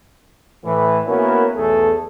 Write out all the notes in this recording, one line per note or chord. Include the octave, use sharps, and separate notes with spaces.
A2 E3 B4
A#3 B3 C#4 E4 F#4 A#4
B1 E2 A3 G#4 A4